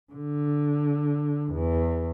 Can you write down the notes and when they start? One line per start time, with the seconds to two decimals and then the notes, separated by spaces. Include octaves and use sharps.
0.13 D3
1.52 E2